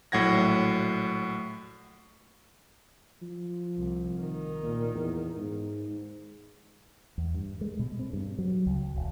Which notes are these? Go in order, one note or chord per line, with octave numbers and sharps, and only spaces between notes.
A#1 A2 F#3 F#5 G#6 A#6
F3
C2
D#3
A#2
E2
G#2
E2
G2
G#3
B2
C4
G2
F#3
C#2
E1